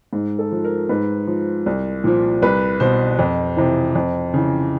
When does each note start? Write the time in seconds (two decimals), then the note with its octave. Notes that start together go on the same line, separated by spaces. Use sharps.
0.13 G#2
0.39 A4
0.52 F3
0.65 A#4
0.89 G#2 B4
1.27 F3
1.66 C2
2.04 A#2 F3
2.42 C2 B4
2.80 B2 C5
3.19 F2
3.57 C3 E3
3.95 F2
4.34 C#3 E3